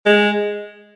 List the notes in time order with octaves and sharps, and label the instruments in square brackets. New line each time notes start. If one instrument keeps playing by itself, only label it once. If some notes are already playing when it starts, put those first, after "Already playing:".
[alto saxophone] G#3